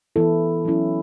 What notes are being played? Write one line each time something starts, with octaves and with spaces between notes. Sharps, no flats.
E3 B3 E4 A4
F#3 C#4 E4